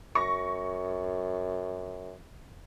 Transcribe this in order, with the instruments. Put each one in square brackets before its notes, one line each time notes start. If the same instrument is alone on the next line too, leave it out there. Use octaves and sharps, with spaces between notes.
[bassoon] F#2 [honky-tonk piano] C#6 A#6